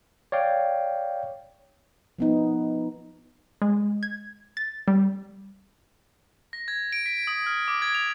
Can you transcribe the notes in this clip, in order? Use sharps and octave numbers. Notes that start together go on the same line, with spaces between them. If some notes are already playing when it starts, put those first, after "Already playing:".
C#5 D5 F5 G5
F3 B3 D#4
G#3
G#6
A6
G3
A#6
G#6
D7
B6
D#6
F6
D6
G#6
F7